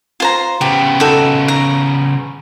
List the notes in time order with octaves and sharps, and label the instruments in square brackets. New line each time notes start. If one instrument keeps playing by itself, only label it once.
[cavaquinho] F4 C5 A#5
[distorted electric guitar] C#3 B3 [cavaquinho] G4
[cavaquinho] D#4 F#4 A4
A#5